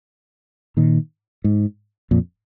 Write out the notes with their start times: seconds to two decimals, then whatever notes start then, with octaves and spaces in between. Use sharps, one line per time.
0.77 A#2 D#3
1.44 G#2
2.11 F2 A#2